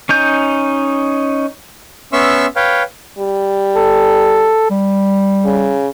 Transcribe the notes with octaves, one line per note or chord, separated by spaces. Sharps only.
C#4 D#4 G6
B3 C#4 E5 C6 C#6 E6
B4 C#5 F5 G5
G3
A4
G3
C#3